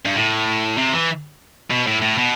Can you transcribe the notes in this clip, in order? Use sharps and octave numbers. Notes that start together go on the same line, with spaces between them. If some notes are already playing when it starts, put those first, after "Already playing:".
G2
A2
C3
E3
B2
A2
A2
B2